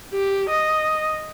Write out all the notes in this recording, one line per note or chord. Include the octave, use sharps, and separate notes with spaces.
G4
D#5